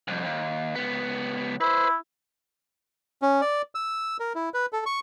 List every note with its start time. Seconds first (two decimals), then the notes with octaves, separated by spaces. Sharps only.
0.08 C2 F2
0.25 D#2
0.75 C#2 B3
1.61 E4 B4 C5
3.22 C#4
3.41 D5
3.75 E6
4.20 A#4
4.35 E4
4.54 B4
4.73 A4
4.86 C#6